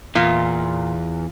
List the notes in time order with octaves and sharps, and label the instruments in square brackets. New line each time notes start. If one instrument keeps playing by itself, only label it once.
[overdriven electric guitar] E2 [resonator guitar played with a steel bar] A#2 [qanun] F4